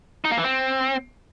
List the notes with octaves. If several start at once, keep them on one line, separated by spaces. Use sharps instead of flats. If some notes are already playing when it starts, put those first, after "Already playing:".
D#4
A#3
E3
C4